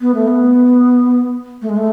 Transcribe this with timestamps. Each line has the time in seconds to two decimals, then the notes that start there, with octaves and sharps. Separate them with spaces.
0.01 B3
0.14 A3
0.27 B3
1.62 A3
1.69 G#3
1.77 A3